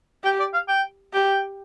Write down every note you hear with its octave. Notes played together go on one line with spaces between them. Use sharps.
G4 G5
D5
F5
G5
G4 G5